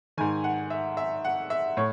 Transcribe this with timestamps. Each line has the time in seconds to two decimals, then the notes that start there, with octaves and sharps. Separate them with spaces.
0.17 G#2 D#3 G#5
0.44 F#5
0.70 E5
0.97 E5
1.24 F#5
1.50 E5
1.77 A2 C#5